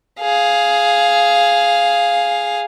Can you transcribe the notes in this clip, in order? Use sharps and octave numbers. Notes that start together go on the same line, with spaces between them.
G#4 F5